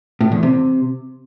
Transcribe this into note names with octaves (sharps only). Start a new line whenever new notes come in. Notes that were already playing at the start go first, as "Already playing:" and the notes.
A2
E2
C3